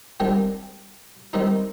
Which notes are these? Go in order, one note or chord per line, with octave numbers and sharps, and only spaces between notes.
C3 D#3 G3 D4 G4
D#3 G3 C4 D#4